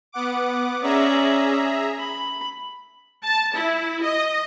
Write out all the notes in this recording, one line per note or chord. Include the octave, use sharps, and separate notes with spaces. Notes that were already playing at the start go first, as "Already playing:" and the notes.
B3 F#5 D6
C#4 G#4 D5 E5 A#5
B5
A5
E4
D#5